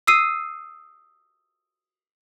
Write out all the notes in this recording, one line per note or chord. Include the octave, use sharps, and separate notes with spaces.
D#6 E6 C7 D#7